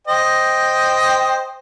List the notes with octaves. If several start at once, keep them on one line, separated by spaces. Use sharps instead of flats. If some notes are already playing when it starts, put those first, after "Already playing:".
C5 D#5 G5